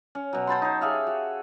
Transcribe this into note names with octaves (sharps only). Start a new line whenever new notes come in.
C#4
B2 F#3
C5 A5 B5 C6
D#4 C#5
G4 G#4 E5 F5
F#4